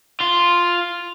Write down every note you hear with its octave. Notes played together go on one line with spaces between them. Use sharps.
F4